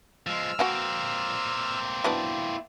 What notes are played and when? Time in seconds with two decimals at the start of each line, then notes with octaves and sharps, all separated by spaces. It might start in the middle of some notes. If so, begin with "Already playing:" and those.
0.27 F3 G#3 E6 F6
0.59 A#3 C4 F#4 F#5 G#5
2.04 F#3 B3 D4 E4